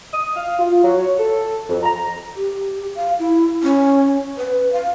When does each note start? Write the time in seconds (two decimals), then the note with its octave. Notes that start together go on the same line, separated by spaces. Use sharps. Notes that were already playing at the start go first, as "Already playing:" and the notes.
0.14 D#6
0.36 F5
0.59 F4
0.83 F#3
0.99 C#5
1.19 A4
1.69 F2
1.83 A#5
2.36 G4
2.96 F5
3.19 E4
3.63 C#4
4.38 B4
4.73 F5